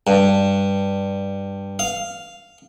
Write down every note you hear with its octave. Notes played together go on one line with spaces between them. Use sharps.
G2
F5